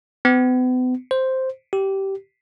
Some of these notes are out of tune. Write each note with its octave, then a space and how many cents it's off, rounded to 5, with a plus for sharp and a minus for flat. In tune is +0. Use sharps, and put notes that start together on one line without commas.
B3 +40
C5 +0
G4 -15